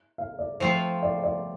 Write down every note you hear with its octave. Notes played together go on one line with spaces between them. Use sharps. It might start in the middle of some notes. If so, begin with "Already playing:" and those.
F5
D5
F3 A3 C4 F4 C5
D5
D5